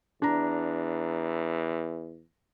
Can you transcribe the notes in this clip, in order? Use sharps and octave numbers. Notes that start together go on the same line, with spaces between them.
E2 D4 A#5